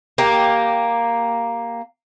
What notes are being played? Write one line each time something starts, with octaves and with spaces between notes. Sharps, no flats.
A#3 G4